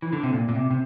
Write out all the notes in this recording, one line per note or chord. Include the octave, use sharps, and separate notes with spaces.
E3
D3
C3
A#2
A#2
C3
C3